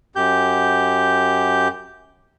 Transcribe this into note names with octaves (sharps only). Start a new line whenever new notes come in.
F#2 G4 G6